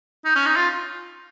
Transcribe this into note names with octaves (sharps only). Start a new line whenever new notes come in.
D#4
C#4
D#4
F4